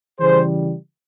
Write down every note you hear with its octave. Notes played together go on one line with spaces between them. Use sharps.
C#3 E3 G3 G#4 C5